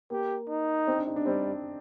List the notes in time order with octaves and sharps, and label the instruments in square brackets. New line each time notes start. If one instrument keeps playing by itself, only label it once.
[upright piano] A#3 [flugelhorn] G4
[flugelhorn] D#4
[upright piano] C4
D4
D#4
D4
[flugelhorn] G3 [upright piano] C4